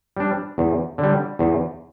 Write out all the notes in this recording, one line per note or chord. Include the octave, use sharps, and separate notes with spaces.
G3 D4
E2
D3 G3
E2